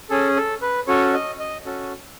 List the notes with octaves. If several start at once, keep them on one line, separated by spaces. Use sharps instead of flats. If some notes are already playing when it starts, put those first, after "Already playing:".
C#4 G#4 A4
A4
B4
C#4 F#4 A4 C#5
D#5
D#5
C#4 F#4 A4